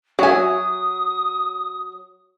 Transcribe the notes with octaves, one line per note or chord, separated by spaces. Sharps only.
F#3 F#4 C#5 E5 G#5 D#6